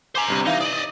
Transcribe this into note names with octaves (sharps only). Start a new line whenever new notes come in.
C5 G#5 A#5 D6 C7
G1 G2 C3
E3 D#4 E5 F5
D5 D#5 D#6